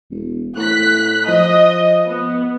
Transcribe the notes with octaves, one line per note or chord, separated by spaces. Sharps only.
E1
A2 F#6 B6
F3 D#5
B3